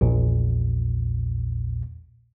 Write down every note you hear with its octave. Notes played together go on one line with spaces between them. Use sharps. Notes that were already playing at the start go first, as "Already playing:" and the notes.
A#1 E2 A#2